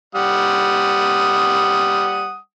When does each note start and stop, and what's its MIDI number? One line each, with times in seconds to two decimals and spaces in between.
0.15 2.37 55
0.15 2.37 78
0.15 2.37 87